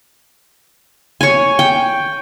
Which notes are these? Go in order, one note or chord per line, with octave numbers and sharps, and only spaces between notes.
C#5 G#5
G5